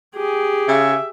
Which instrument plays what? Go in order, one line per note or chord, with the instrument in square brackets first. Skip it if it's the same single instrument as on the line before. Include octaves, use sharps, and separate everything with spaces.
[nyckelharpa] G4 G#4
[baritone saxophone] C#3 [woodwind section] E5